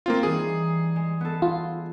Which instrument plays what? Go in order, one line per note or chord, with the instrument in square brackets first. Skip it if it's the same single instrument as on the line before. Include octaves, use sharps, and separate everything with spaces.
[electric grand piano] A#3 C4 F4
[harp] E3 G3 D#4 [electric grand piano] G#4
[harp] G#3
B3 A4
[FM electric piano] F4